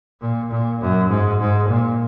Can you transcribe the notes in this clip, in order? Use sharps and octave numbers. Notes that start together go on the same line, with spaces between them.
A#2
A#2
F#2
G#2
G#2
A#2